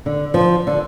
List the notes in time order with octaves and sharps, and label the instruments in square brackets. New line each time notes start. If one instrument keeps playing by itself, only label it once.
[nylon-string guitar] D3
F3
D3